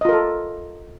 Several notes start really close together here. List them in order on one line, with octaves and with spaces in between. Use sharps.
D#5 F4 A#4 A4